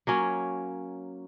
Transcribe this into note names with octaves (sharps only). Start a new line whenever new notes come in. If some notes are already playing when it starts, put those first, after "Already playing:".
F#3 A#3 C#4